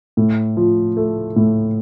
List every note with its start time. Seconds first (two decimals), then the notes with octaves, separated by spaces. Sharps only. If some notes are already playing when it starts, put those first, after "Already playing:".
0.17 A2
0.57 F3
0.97 A3
1.36 A2